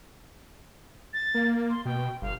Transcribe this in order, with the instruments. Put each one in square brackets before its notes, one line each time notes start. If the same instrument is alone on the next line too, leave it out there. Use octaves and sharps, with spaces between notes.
[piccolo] A6
[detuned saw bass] A#3
[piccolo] C6
[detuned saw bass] B2 [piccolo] G5
[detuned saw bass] G1 [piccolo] F5